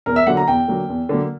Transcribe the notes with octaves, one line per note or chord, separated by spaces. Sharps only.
E2 A#4
E5
D3 F#3 A#3 F#5
A#5
E2 G5
D3 F#3 A#3
E2
D3 F#3 A#3